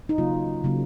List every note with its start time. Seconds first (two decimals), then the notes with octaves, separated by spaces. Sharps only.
0.09 D#4
0.18 C#3 F#3 A#3 F4
0.64 C#3 F#3 A#3